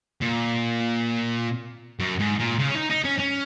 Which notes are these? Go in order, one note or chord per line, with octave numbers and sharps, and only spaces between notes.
A#2
F#2
G#2
A#2
C#3
C#4
D#4
D#4
C#4
C#4